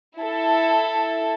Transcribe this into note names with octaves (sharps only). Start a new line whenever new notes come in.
E4 A4